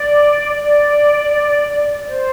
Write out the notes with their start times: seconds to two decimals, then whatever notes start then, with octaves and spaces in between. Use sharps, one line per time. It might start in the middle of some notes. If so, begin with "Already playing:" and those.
Already playing: D5
0.55 D5
2.06 C5